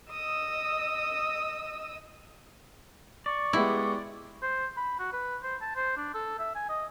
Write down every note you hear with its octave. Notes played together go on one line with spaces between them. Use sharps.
D#5 D#6 E6
D5 C#6
G#3 B3 E4 G4
C5
B5
F#4
B4
C5
A5
C5
D4
A4
E5
G#5
D#5